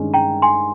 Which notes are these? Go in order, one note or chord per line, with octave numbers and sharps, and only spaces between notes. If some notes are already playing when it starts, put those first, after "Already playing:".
Already playing: G2 D#3 G#3 C#4
G5 A#5
G#5 C6